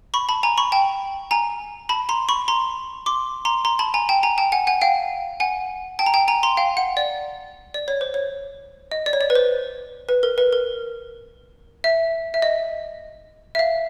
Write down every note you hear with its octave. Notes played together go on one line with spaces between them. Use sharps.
B5 C#6
A5 B5
G#5 A#5
B5 C#6
G5 A5
G#5 A#5
A5 B5
A#5 C6
B5 C#6
A#5 C6
C6 D6
A#5 C6
A#5 C6
A5 B5
G#5 A#5
G5 A5
G#5 A#5
G5 A5
F#5 G#5
F#5 G#5
F5 G5
F#5 G#5
G5 A5
A#5
G5 A5
G#5 A#5
A#5 C6
F5 G5
F#5
D5
D5
C#5
C5
C#5
D#5
D5
C#5
D5
B4
C5
B4
A#4
B4
A#4
E5
E5
D#5
E5
F5